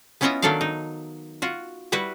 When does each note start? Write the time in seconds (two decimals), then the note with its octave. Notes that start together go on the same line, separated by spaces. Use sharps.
0.21 B3 C#4 E4 F4 D#5 E5
0.42 D#3 F#3 D4 A4 D5 F5
0.61 D#4
1.42 F4 F#4
1.92 G3 E4 F#4 B4